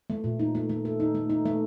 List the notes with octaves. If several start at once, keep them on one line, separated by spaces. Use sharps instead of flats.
A3
A#2
D#4
A3
A3
A4
D#4
A3
D#4
A3